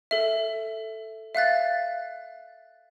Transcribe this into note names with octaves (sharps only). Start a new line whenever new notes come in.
A4 E5
E5 F5 F#6 A6